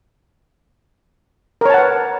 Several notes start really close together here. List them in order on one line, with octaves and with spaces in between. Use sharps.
A#4 C#5 A5 F#5 B4